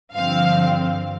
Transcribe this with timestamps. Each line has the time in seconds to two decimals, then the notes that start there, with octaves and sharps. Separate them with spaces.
0.13 G2 D3 F3 C4 F5